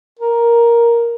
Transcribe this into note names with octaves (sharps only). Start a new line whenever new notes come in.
A#4